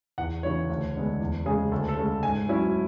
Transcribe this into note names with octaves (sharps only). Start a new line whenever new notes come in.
E2 F#5
C#3 E3 C#5
D2
D3 G#3 B3
E2
C#3 G#3 G#4
D2 A4
A4
C#3 G#3 C#4
G#2 G#5
F#3 C#4 E4